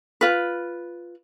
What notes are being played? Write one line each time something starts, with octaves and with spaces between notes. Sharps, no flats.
F4 B4